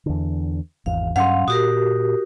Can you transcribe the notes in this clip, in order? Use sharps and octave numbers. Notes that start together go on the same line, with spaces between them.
E2 D3
G#1 E2 F5
G2 F#3 C#4 F5 F#5 C6
A#2 F#4 G4 A#4 D#6